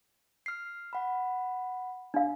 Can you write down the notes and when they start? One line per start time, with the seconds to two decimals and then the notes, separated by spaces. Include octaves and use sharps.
0.46 F6 C7
0.93 F#5 B5
2.14 D4 F5